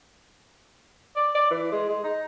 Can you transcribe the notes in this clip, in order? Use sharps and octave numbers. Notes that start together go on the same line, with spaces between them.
D5
D5
E3
G#3
G#3
D#4